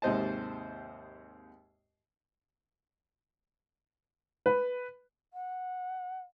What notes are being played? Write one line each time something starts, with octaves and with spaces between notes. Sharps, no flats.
D#2 G#2 C3 C5 D#5 A5
B4
F#5